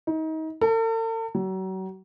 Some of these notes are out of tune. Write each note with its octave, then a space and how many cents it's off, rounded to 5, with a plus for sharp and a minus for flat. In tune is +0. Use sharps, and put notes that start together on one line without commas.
D#4 +30
A4 +45
F#3 +35